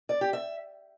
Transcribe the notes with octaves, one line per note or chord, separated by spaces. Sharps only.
D5
G4
E5